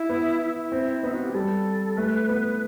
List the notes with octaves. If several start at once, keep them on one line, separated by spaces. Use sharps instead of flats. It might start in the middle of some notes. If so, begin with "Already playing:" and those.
Already playing: E4
B3
E4
C4
B3 D#4
F#4
G4
G3 A4
A3 B4
B3